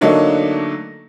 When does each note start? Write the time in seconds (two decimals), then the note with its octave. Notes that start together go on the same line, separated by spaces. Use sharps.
0.01 D3 F#3 A3 A#3 D4 D#4